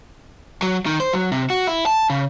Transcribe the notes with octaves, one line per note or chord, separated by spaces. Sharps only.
F#3
D#3
C5
F#3
C3
F#4
E4
A5
C#3